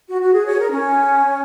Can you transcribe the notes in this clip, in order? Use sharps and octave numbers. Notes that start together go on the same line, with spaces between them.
F#4
F#4
G#4
C#5
A#4
C#4